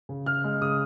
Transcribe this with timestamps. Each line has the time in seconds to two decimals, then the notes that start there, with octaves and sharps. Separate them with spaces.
0.09 C#3
0.26 C#3 F6
0.44 G#3
0.62 C#3 D#6